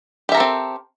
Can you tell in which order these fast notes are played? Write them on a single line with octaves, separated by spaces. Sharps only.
G4 E5 A#4 A4 C4